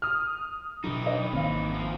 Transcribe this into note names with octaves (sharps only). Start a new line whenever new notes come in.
D#6 F6
B2 D3 E3 F#3 D#4
B4 D#5 F5
G#1 D#3 A#3 C4 F5
F#2 F3